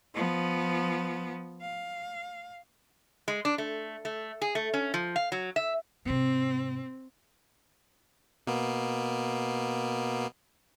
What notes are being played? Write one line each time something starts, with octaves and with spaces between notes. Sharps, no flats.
F3 B3
F5
G#3
D4
A3
A3
G#4
A3
C#4
F3
F5
F#3
E5
G#2 C3 C4
B2 A#3 B3